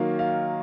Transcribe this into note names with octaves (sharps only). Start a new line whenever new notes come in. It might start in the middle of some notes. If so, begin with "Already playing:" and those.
Already playing: D#3 F#3 A#3 F5
F5